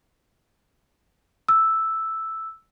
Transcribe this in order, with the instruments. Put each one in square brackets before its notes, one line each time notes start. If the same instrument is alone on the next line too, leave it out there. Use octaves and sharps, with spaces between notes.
[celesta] E6